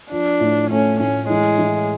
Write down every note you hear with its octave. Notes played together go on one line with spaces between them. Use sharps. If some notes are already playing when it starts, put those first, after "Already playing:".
F3 D4
A2
A3 C#4
A2 C#4
E3 G#3
E3